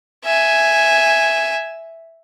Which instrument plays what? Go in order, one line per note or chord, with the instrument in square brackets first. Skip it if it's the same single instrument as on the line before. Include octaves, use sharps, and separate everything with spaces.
[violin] E5 G#5